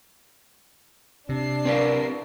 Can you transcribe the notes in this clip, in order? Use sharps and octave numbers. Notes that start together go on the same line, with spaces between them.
C3 D4 C7
C4 G4 A#4 B4 D5 F5